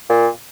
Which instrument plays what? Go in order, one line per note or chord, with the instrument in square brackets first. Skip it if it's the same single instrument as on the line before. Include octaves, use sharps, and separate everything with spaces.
[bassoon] A#2